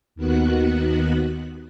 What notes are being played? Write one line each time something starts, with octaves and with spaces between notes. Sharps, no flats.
D#2 D#3 B3 F#4 F#6